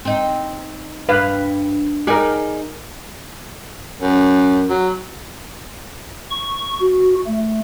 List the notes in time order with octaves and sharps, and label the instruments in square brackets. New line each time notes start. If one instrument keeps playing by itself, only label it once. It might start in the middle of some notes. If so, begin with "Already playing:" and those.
[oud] C4 D#4
[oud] G2 [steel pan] B4 F5
[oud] D#4 G#4 D5 [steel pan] G4 A#4
[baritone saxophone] F#2
F#3
[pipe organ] C#6
F#4
A3